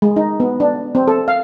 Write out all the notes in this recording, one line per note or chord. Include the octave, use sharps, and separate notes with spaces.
G#3
D#4
B3
D4
C4
A4
F5